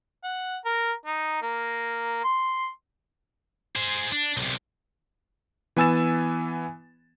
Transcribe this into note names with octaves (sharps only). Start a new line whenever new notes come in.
F#5
A#4
D#4
A#3
C6
G#4 C5
D4
B1 C3
E3 B3 G#5 E6 A6 E7